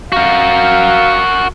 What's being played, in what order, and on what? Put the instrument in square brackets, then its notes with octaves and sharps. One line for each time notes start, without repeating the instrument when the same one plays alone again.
[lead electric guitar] F#4 A#4 [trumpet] F5